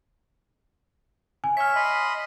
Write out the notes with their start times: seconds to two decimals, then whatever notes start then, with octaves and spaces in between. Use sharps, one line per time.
1.44 G#5
1.57 C#5 E5 F6 B6
1.75 D#5 B5 C6